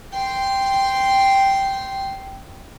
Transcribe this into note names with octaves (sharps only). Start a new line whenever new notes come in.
G5 C6